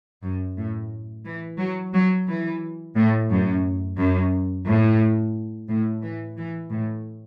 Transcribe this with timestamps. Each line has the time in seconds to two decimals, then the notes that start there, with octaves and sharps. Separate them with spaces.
0.22 F#2
0.57 A2
1.25 E3
1.59 F#3
1.93 F#3
2.27 E3
2.95 A2
3.30 F#2
3.98 F#2
4.66 A2
5.69 A2
6.02 E3
6.36 E3
6.70 A2